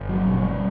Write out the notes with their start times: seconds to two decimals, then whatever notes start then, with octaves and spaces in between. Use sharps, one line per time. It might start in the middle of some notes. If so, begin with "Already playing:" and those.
Already playing: G1
0.09 F#3
0.27 B2 F#3
0.45 G3